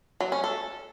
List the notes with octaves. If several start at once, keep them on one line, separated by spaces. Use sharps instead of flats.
F#3
C#4
A4